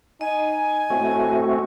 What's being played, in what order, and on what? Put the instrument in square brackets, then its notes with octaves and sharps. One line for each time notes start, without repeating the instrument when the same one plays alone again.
[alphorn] D#4 [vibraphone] D#5 [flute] G#5
[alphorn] A2 [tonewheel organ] A3 C4 F#4